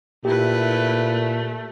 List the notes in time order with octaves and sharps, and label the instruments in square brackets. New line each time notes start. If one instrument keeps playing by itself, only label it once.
[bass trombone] A#2 [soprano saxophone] A3 [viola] E4 B4 [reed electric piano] G4